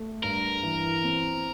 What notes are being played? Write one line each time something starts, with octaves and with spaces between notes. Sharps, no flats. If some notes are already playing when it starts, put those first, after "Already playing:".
Already playing: A3
G2 A#4
E3
C4